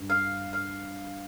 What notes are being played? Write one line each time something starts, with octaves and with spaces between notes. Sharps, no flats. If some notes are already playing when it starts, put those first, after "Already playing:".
Already playing: G2 G3
F5
F5